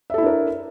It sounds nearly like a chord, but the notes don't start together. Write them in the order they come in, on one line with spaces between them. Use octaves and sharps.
E5 A4 E4 D4 A#4